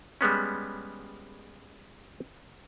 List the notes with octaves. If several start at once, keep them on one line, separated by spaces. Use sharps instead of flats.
G3 G#3 B3 C#4